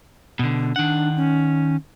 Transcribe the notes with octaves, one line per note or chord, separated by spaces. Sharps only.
B2 D3
D#3 D4 F#5
C#4